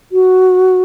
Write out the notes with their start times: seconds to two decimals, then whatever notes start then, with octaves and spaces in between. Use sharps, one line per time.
0.12 F#4